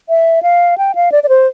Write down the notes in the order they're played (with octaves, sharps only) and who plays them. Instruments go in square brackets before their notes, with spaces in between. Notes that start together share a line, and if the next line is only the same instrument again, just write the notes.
[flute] E5
F5
G5
F5
D5
D5
C5